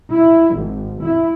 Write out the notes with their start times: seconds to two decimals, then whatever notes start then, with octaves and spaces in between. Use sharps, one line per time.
0.11 E4
0.54 G#1
1.03 E4